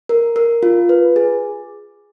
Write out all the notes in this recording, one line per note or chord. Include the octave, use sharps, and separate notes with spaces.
A#4
A#4
F4
B4
G#4